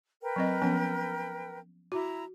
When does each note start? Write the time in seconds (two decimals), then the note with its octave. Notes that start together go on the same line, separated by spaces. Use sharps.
0.23 A#4 B4 G5
0.36 F#3 C4 D#5
0.62 F3 B3 C#4
1.92 E4 F#4 A#5